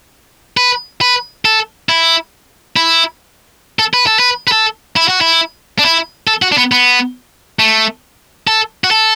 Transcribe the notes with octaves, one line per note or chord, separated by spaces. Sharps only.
B4
B4
A4
E4
E4
A4
B4
A4
B4
B4
A4
E4
F#4
E4
D4
E4
A4
F#4
D4
B3
B3
A3
A4
F#4
A4